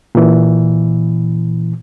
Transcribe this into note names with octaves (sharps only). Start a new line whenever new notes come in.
A#2 E3